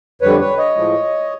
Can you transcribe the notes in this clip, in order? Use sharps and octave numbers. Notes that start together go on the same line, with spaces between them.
F2 D3 G3 B4 C#5
B4 C#5
C#5 D#5
A2 F3 G#3